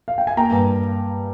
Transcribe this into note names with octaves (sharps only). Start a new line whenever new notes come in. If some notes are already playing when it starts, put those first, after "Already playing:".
F5
G5
G#5
A#3 G5 A#5
G2